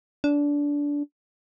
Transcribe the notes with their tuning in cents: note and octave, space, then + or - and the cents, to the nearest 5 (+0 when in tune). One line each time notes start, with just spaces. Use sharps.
D4 -20